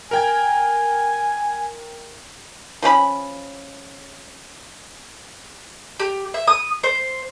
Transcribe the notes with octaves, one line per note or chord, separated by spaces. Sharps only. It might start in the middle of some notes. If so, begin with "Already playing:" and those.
A#4 G5 G#5 G#6
F3 C#4 G4 B5
G4
E5
D#6
C5